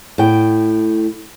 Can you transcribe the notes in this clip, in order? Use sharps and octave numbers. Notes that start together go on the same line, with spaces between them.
A2 G5